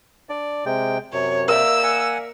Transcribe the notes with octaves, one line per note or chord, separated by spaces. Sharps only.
D4 D5
C3 G#3 G5
F#2 C3 C#5
A#3 A#4 D5 E5 E6
F#5 G#5